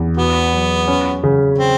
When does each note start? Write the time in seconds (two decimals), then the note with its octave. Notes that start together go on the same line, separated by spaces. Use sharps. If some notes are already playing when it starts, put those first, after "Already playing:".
Already playing: E2
0.17 B3 F#4
0.53 F#3
0.87 C#4
1.24 C#3
1.58 C4